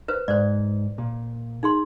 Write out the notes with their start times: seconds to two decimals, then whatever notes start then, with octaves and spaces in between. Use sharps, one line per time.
0.08 B4 C5
0.28 G#2 C5 D5
0.98 A#2
1.63 D#4 G#4 C6